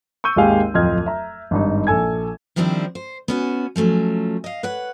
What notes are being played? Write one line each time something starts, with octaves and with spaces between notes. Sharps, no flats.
C#6 E6 G6 D#7
G#1 D#2 G#3 G4 F5 G#5
D1 F2 F4 D#5 F6 G#6
E5 A#5
G#1 G2 D#4
A#1 A4 G#5 G#6
D#3 F3 G3 C4 D4 E4
C5
B3 C#4 F#4
F3 F#3 A3 C#4
D#5 F5
B4 C#5 F#5